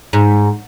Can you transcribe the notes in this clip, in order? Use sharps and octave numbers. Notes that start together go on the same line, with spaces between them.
G#2